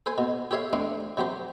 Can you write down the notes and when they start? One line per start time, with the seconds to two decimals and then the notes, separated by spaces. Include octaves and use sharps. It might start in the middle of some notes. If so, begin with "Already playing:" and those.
0.06 A4 C5 G#5
0.18 B2
0.51 G4 A4 C#5 E5 F5
0.73 A3 C4 D4 F5
1.17 C3 F#3 G4 C5